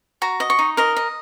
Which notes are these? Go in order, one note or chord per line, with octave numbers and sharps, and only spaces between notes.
F#4 A#5
D#5
C#6
D#4
A#4 D#5
D#5